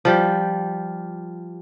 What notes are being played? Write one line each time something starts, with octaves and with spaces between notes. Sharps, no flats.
F3 G3 G4